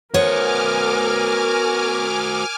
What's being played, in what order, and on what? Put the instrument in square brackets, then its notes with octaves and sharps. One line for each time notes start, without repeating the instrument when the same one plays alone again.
[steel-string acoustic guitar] B3 C#5 [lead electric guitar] F#4 C5 [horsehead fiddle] A#4 [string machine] G#5 D6 F6